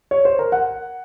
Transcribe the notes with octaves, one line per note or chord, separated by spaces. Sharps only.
C#5
C5
A#4
F#5